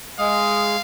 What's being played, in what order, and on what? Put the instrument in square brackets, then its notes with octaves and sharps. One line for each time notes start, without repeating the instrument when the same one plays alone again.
[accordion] G#3 [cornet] F5 [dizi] D#6